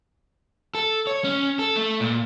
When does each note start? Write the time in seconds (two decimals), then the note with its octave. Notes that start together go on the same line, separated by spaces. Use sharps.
0.75 A4
1.07 C#5
1.24 C#4
1.59 A4
1.76 A3
2.01 A#2